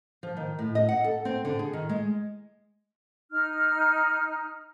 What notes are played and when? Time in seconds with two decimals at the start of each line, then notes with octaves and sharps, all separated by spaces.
0.23 F3
0.37 D#3
0.59 A2
0.75 D#5
0.89 F#5
1.04 A4
1.25 C4
1.45 D3
1.59 G#4
1.73 D#3
1.89 G#3
3.31 D#4 F6